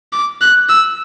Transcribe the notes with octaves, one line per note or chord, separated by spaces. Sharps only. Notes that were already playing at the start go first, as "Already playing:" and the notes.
D6
F#6
E6